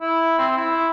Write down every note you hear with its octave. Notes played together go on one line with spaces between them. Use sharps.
E4
C4
E4